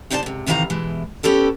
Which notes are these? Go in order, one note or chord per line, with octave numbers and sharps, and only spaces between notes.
C3 D#4 C5 D5 D#5 A5
G#2 C3
D2 C3 D#3 E3 F5 A#5
B2 E3 G#3
B3 C#4 G4 A4 B4